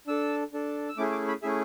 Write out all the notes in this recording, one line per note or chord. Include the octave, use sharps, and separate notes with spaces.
D4 A4 E6
D4 A4
E6
A3 C#4 E4 G#4 D6
D6
B5
A3 C#4 E4 G#4 E5